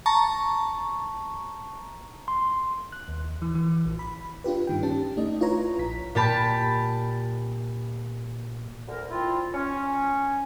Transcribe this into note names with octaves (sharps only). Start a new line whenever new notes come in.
A5 A#5 C#6
C6
F#6
D#2
E3
E3
A#1
B5
D4 F4 G4 B4
G2 D#3 G5
C#4 G4 A5
A3 D4 D#4 D5 D#5
E4 F4 B4 C#5 A#5
A#1 B6
A#2 G4 A5 B5
D2 A#4
C4 E4 F4
C#4